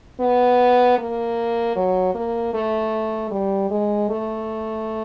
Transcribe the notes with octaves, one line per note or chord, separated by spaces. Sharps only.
B3
A#3
F#3
A#3
A3
G3
G#3
A3